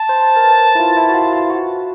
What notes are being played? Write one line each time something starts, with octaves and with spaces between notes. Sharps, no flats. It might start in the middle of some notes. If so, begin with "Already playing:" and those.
Already playing: A5
C5
A#4
B4
E4
F4
E4
F#4
F4
F4
F#4